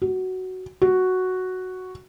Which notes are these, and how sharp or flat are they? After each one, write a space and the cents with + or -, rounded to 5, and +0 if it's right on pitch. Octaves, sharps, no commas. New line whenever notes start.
F#4 +10
F#4 +0